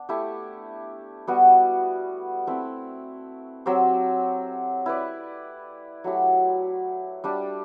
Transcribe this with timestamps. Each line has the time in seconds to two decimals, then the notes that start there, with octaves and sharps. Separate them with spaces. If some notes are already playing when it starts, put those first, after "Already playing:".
Already playing: B3 D4
0.09 A3 E4 G4
1.27 G3 B3 F#4
2.47 A3 C4 E4
3.66 F#3 C4 G4 C5
4.86 E4 B4 D5
6.04 F#3 A3 E4 G4
7.24 G3 D4 G4